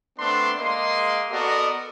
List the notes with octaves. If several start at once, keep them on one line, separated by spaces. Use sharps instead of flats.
A3 B3 C4 D4 C6
G#3 A#3 D#5 C6
B3 F#4 A4 A#4 D5 D#5